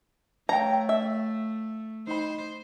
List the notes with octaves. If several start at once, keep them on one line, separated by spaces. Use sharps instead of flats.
A3 C#5 F5 G5 A#5
E5
D#4 C5 B5